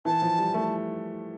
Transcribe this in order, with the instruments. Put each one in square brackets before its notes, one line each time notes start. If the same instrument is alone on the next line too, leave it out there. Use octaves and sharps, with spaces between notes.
[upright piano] E3 [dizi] A5
[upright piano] F3
G3
A3